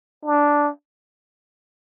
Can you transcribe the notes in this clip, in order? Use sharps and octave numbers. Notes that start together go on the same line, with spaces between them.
D4